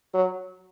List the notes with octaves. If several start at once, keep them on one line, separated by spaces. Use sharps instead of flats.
F#3